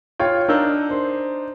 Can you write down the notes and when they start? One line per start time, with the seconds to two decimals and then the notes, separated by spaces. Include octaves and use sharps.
0.19 F4 C#5 G5
0.48 D4 D#4 A#4 E6 G6
0.91 C5